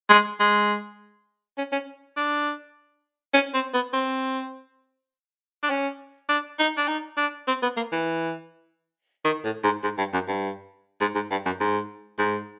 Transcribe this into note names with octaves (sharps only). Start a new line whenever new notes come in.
G#3
G#3
C#4
C#4
D4
C#4
C4
B3
C4
D4
C#4
D4
D#4
D4
D#4
D4
C4
B3
A#3
E3
D#3
A2
G#2
G#2
G2
F#2
G2
G#2
G#2
G2
F#2
G#2
G#2